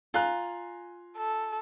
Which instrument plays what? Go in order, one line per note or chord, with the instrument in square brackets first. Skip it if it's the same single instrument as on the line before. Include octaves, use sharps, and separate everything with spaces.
[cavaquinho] F4 [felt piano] G#5 A#5 F#6
[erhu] A4